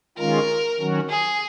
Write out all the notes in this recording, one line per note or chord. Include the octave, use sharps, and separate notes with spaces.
D#3 G#3 C#4 F4 A#4
D#3 F#3 C#4 F#4
G#4